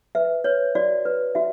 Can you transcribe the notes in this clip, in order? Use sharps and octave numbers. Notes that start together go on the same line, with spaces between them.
B4 E5
B4 C#5
F#4 D5
B4
F#4 E5